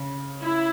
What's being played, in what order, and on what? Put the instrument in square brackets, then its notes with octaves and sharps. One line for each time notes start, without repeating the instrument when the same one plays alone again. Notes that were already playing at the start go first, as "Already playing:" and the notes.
Already playing: [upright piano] C#3
[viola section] E4